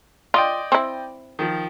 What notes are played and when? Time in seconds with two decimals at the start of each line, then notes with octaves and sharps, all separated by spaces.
0.34 F4 D5 D#5 G5
0.72 C4 E4
1.39 D#3 F3